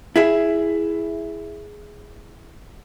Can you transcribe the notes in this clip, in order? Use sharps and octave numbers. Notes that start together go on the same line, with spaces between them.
E4 G#4 E5